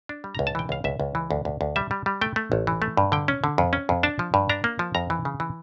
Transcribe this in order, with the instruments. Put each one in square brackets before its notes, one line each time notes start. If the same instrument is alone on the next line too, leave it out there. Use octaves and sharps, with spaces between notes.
[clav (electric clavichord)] D4
G3
C#2 A#5
A5
E3 G5
C#2 F5
C#2 E5
C#2
E3
D2
D2
D2
G3 E5
G3
G3
A3 G5
A3
A1
E3
A3
G2
D3 G5
C#4
D3
F2
C#4
F2
D4 A5
F3
G2
D4 A#5
A#3
F3
F2 A#5
E3
C#3
E3